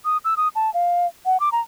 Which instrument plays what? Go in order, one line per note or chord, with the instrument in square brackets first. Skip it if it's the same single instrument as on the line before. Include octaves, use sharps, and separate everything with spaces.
[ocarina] D#6
E6
D#6
A5
F5
F#5
D6
A#5